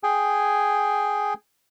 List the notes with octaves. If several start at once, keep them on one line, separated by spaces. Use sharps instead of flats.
G#4 G5 G#5